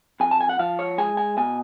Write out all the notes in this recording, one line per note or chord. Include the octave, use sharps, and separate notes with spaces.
F2 G#5
A5
G#5
F#5
F3 F5
C#5
G#3 G#5
G#5
B2 G#5